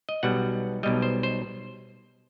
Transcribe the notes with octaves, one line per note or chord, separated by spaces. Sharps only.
D#5
B1 B2 G3 F#5
B1 B2 G3 D#5
C5
C5